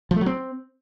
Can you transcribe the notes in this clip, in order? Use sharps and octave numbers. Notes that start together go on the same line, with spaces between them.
F3
A3
F#3
C4